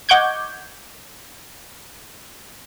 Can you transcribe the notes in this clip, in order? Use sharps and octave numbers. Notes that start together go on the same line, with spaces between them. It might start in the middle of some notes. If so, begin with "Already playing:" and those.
D#5 F#5 C#6 D6 G6 G#6